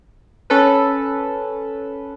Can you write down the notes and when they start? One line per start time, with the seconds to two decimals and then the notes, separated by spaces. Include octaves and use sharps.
0.50 C#4 A4 B4